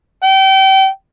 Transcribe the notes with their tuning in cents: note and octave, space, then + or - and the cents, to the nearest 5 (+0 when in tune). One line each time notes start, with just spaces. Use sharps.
G5 -30